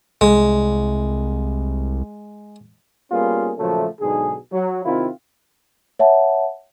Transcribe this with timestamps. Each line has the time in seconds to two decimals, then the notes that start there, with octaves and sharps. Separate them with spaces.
0.21 C2 G#3
3.12 G3 A#3 B3 C#4 F4 G#4
3.58 A#2 C#3 F3 F#3 A3
4.01 B1 G#2 B2 D3 G#4
4.52 F#3
4.85 C3 D#3 C4 E4 F4
5.99 C#5 E5 F#5 A5